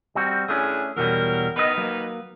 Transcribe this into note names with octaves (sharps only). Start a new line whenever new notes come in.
G3 C4 F#4
A2 A3 C#4 D4 G#4
E2 B2 F#3 G3 A#4
D#3 B3 D#4 B4 D#5
F#3 A#3